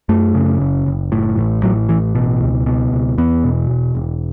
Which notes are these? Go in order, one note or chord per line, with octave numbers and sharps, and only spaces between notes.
F#2 A3
C#3
F#1
F#1
A2
A1
A2 F#3
A1 E3
B2
C#2
B2
C#2
E2 B3
B2
E1
E1